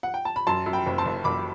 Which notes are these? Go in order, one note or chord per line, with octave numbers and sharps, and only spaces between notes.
F#5
G5
A5
B5
F#2 A5 C6
F#2
G5 B5
F#1
A5 C6
F#1
F#1 B5 D6